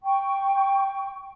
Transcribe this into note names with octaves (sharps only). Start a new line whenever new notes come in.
G5 C#6